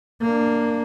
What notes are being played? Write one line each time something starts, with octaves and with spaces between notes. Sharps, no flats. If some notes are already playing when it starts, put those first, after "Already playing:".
A#3 D4